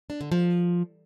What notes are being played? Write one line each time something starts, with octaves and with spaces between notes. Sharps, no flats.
D4
D3
F3